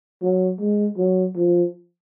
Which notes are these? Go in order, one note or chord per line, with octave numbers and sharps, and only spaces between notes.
F#3
G#3
F#3
F3